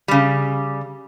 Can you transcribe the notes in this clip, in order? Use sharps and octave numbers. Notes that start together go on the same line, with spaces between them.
C#3 G3